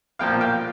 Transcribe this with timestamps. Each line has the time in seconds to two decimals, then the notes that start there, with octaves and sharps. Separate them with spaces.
0.19 B1 A#2 F3 A#3 F5 G5
0.41 F5 G5